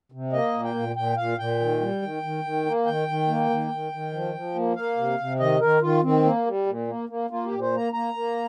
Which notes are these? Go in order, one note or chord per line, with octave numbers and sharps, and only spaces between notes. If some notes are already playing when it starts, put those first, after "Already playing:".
C3
A#3 D#5
A#2
G5
A#2
A#2 G5
A#2 F5
A#2 G5
D#3
G3
D#3
D#3
D#3
A#3
D#3 G5
D#3
A#3
D#3
D#3
D#3
F3
F3
A#3
A#3 F5
C3
C3
D#3 D#5
D#3 A#4
D#3 F4
D#3 C4
A#3
G3
A#2
A#3
A#3
A#3 F4
G4
A#2
C5
A#3 A#5
A#3 A#5
A#3